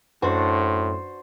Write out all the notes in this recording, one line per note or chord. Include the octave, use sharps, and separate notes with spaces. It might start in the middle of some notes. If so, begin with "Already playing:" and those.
F#2 A2 D4 F#4 C5